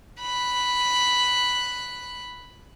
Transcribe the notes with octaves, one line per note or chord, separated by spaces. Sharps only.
B5 F#6